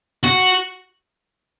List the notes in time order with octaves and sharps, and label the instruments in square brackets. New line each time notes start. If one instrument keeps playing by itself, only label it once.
[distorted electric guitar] F#4